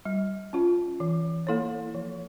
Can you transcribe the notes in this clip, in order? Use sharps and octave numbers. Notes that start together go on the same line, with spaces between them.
G3
C#4 F4
E3
A#3 E4 A4 C#5
F3